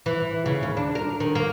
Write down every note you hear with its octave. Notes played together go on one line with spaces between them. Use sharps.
E3
C#3
D#2
D4
A#4
D#3
A#3